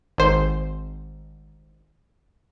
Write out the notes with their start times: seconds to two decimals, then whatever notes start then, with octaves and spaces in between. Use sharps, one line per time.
0.18 G#1 C5